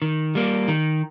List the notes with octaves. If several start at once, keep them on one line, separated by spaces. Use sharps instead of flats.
D#3
G3 A#3
D#3